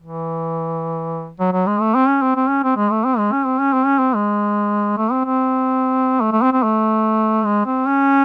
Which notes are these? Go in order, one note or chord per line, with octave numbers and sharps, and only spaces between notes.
E3
F#3
F#3
G#3
A3
C4
C#4
C4
C4
C#4
C4
G#3
A3
C4
G#3
C#4
C4
C#4
C4
C#4
C4
G#3
A3
C4
C4
A3
A3
C4
C4
A3
G#3
C4
C#4